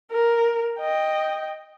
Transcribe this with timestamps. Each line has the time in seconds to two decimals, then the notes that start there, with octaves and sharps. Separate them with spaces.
0.11 A#4
0.80 D#5 G5